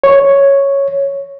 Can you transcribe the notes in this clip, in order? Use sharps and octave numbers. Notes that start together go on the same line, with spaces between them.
C#5